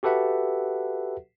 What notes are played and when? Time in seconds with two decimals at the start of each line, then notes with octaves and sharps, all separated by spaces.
0.03 F#4 G4 A4 B4 E5 F#5